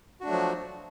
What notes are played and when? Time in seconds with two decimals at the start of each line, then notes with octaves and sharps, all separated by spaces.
0.21 F#4
0.23 D4
0.26 A3
0.29 F#3
0.32 F3